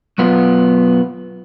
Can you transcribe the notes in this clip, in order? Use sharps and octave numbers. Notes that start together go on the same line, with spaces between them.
B1 F#2 B3 F4